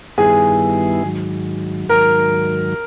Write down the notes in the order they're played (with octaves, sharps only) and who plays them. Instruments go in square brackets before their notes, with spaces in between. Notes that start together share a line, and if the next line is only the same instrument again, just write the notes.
[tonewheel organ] G2 D#3 G3 B3 E4 [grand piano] G#4
[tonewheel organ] G#2 D#3 F#3
[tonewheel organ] G#2 D#3 F#3 [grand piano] A#4